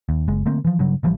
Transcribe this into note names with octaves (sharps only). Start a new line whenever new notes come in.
D#2
F#1 G#3
D3 A3 A#3 C4
E3 F3
G2 C#3 F#3
A1 E3 F3 G3